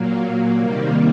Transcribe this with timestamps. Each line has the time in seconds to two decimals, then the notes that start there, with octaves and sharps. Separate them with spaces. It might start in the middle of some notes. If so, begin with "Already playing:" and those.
Already playing: A#2 F#3 A#3
0.57 C3 D#3 G3 A#3